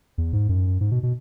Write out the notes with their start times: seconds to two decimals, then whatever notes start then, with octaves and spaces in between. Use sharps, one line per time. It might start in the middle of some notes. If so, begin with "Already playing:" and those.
0.18 E2
0.33 G#2
0.49 F#2
0.81 G#2
0.91 B2
1.03 B2